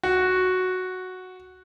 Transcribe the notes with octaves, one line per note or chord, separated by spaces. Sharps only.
F#4